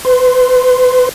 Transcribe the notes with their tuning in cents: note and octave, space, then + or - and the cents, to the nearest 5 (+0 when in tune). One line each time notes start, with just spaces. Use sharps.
B4 +30 C6 +0